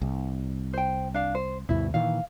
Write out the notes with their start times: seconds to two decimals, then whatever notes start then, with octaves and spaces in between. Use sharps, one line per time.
0.02 C2
0.73 C5 G5
1.14 D4 F5
1.35 C5
1.69 D2 G2 B2 E4
1.94 A#2 D#3 E3 F5